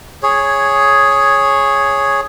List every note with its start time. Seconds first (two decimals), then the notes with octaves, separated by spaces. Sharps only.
0.23 G#4 C#5